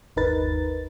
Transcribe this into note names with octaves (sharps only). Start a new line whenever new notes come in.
G1 D#2 D#4 A#4 B4 A6